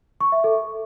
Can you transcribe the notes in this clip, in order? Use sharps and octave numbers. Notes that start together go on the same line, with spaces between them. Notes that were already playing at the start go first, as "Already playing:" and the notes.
C#6
E5
A4